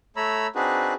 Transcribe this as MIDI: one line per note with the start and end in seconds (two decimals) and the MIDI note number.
0.16 0.47 57
0.16 0.47 73
0.16 0.47 82
0.16 0.47 83
0.16 0.47 88
0.55 0.94 60
0.55 0.94 62
0.55 0.94 63
0.55 0.94 66
0.55 0.94 68
0.55 0.94 71